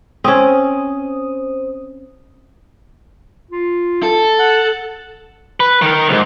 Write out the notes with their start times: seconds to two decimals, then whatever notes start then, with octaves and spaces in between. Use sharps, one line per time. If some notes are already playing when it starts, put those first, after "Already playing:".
0.24 C4 C#4 C5 D#6
3.51 F4
4.03 A4
4.39 F#5
5.60 B4
5.82 D#3 A#4
6.09 C2 G#2